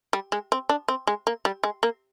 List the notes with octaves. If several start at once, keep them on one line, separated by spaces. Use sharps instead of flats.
G3
G#3
C4
D4
C4
G#3
A#3
G3
G#3
A#3